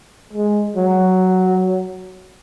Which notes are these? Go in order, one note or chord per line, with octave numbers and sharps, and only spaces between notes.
G#3
F#3